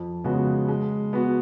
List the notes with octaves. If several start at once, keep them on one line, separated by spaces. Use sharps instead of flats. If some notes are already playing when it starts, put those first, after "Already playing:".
Already playing: F2
C#3 G#3 B3 F#4
G#3
B3 F#4